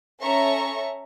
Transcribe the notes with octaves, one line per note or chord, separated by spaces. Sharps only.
C#4 A4 E5 A#5 C#6